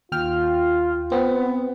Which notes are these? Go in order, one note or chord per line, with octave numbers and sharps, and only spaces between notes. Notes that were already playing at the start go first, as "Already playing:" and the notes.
D#2 F4 G5 F6
B3 C4